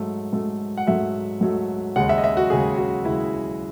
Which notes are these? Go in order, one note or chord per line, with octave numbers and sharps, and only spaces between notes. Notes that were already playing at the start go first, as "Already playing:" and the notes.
Already playing: G#2 F#3 A3
G#2 F#3 A3
F#5
G#2 F#3 A3 E5
G#2 F#3 A3
D#2 C#3 G#3 F#5
E5
D#5
E5
F#4
D#2 C#3 G#3 G#4
F#4
D#2 C#3 G#3 E4